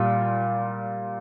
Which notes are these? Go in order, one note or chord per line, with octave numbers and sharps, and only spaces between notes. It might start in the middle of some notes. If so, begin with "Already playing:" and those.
Already playing: A#2 G3 F4